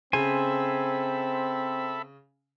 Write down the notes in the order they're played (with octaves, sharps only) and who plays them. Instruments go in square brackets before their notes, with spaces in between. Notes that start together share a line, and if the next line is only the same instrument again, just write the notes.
[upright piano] C#3 [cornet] C4 [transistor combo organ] A4 E5 B5 [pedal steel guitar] C5 G#5